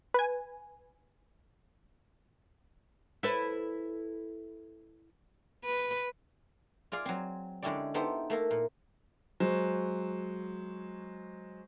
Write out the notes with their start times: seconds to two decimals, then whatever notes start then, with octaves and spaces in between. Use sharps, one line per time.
0.14 B4 G#5
3.23 E4 A4 B4
5.65 B4
6.92 F4 G#4 D5 F5
7.05 F#3 C4
7.62 D3 G#3 C#4 E4 G4 D5
7.94 B3 D#4 E4 G4 A4 C5
8.30 A3 A#3 A4
8.51 A#2
9.40 F#3 G#3 C5